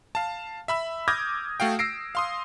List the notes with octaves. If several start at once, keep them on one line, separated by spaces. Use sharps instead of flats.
F5 A5
E5 B5 E6
D6 D#6 F6 G6 G#6 A#6
A3 F#4 F5 G5
E6 A#6 C7 D7
F5 C6 D#6